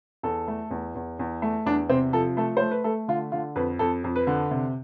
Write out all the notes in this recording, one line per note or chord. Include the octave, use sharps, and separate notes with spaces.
E2 A4
A3
E2
E2
E2
A3
E2 D4
C3 C4
F3 A4
A3 A4
A3 C5
B4
A3 A4
D3 F4
D3 F4
F2 B4
F2 A4
F2
B4
D3
C3